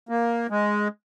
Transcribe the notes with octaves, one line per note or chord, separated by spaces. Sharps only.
A#3
G#3